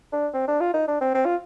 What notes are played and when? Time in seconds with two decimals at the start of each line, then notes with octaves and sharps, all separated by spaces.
0.13 D4
0.34 C4
0.47 D4
0.61 F4
0.74 D#4
0.88 D4
1.01 C4
1.15 C4
1.26 F4